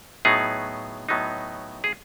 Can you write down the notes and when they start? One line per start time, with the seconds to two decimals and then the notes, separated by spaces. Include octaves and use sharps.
0.25 A2 F#3 B3 D#4 G#4
1.09 A2 F#3 B3 D#4
1.84 G#4